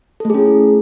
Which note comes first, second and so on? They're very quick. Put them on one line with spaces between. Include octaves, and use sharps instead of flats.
A4 A3 G#4 C#4 E4